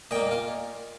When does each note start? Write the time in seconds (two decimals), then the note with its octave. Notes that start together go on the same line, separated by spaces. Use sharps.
0.11 A#2 A#3 D#5 G5
0.31 F4